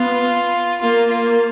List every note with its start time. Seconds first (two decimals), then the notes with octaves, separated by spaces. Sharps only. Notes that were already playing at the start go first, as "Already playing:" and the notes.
Already playing: B3 F4
0.81 A#3 F4
1.10 F4